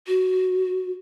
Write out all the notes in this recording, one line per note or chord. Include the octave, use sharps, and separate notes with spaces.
F#4